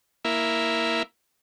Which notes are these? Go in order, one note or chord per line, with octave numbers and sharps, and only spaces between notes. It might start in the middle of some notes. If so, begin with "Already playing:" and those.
A#3 E4